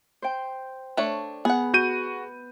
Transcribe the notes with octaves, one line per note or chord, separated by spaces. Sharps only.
C5 G5
A3 D4 C#5
B3 G#4 F#5
F#4 G6 D#7